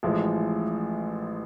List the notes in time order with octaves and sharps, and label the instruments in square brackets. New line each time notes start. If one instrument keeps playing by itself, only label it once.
[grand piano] A1 A2 F3 G#3